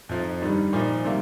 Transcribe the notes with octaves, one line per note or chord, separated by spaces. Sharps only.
F2 F3 D#4
G2 D#3 G3 D#4
A#2 F3 D#4
C3 D#3 G3 A#3